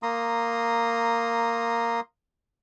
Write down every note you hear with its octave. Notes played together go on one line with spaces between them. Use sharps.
A#3 A#5 C6 D#6